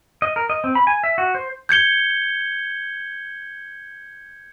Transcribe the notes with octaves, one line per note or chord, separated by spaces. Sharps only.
D#5
A#4
D#5
C4
B5
G#5
E5
F#4
C5
G6 G#6 C#7 G7